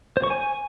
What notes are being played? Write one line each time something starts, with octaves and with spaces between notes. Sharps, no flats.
C5
C#6
G#5